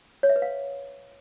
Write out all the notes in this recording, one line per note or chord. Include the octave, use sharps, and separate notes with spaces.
C#5
E5
B4
F5